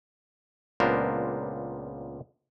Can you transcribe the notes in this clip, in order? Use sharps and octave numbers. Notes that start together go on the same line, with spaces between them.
C#2 A#2 B3 D4 A#4 C5